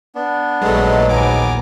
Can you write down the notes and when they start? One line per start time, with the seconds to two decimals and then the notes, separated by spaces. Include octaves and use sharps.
0.15 B3 D4
0.62 A#1 G#2 B2 F#3 G#3 A3
1.09 D#2 B3 G#5 A#5 D6